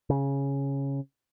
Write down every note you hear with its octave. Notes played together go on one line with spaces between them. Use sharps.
C#3